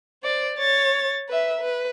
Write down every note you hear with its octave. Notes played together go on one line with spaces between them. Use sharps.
C5 D5
C#5 A6
B4 E5
B4